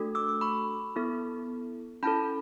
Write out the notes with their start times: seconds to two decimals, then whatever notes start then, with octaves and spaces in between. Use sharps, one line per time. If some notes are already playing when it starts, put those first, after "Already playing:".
Already playing: A3 D4 F#4 A4
0.15 D6 E6
0.28 D6 E6
0.41 B5 C#6
0.96 B3 E4 A4
2.03 C#4 E4 A4 A5 B5